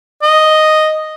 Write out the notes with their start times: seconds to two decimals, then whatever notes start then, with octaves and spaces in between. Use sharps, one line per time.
0.23 D#5